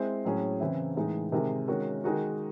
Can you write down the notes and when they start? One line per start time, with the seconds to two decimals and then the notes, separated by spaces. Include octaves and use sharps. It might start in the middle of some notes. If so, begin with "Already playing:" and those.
Already playing: G#3 C4 E4 C5
0.25 A2 F#3 C#4 G#4
0.60 C#3 E3 C4 E4
0.96 A2 E3 G#3 D#4
1.32 C3 D#3 G#3
1.68 D#3 G#3 C#4 F#4
2.04 D#3 G#3 D#4 F#4